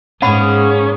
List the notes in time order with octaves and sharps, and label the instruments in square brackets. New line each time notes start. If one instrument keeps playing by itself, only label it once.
[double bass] G#2 [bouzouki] A#3 B3 G#4 [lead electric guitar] C#4 [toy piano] F#5 B5